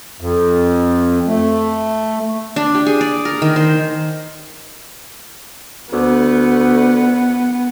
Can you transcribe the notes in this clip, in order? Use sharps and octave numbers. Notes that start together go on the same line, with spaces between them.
F2
A3
D4
G4
G#4
D5
A#4
D#3
C5
D2 B3